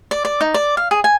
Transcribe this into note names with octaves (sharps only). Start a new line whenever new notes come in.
D5
D5
D#4
D5
F5
G#4
G#5